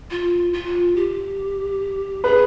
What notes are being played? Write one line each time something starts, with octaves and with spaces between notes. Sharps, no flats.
F4
F4
G4
G#4 B4